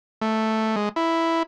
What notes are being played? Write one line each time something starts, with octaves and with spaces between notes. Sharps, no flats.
A3
G#3
E4